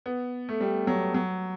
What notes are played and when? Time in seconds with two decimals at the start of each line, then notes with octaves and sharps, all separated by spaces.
0.06 B3
0.49 A3
0.60 G3
0.87 F#3
1.14 F#3